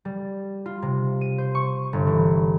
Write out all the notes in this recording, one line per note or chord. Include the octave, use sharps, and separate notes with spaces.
G3
F4
C3
D#7
C5
C#6
G1
E3